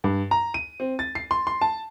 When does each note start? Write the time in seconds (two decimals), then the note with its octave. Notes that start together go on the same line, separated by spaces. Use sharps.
0.04 G2
0.31 A#5
0.54 D#7
0.80 C4
0.99 A6
1.15 C7
1.31 C6
1.47 C6
1.61 A5